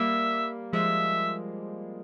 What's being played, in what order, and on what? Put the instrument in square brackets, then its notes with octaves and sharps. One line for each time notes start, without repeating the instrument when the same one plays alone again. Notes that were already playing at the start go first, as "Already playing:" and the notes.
Already playing: [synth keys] G3 A#3 [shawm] E5
[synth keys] F3 G#3 [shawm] E5